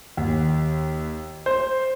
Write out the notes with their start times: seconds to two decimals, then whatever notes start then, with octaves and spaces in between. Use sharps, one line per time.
0.17 D#2
1.46 C5